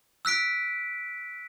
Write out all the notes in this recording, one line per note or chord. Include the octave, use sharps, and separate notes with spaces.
E6 F#6 B6 D7